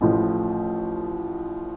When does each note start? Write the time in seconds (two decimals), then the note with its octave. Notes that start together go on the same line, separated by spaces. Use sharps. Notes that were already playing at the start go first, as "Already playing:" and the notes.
0.01 A1 A2 F3